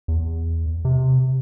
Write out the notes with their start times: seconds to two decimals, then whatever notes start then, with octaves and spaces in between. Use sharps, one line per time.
0.08 E2
0.85 C3